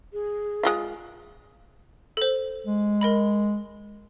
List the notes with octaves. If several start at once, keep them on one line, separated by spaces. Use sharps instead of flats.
G#4
G#3 F4 F5
A4 C5
G#3
A#4 D#5 B5